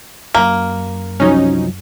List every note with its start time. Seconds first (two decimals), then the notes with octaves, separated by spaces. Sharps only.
0.34 F#2 A#3
1.20 C2 F3 F#3 C#4 D#4